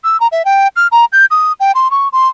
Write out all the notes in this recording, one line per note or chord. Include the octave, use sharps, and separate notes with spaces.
E6
A#5
E5
G5
F6
A#5
G6
D#6
G5
C6
C#6
C6